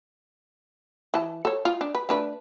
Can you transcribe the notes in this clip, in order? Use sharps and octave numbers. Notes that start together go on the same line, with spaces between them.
E3 A5
A4 C#5
F4
D4
B4
A3 D4 B4